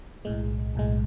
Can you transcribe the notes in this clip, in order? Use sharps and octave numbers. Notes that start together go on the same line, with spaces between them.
B1 A2 G#3
B1 A2 G#3